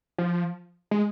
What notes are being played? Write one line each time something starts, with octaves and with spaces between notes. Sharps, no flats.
F3
G#3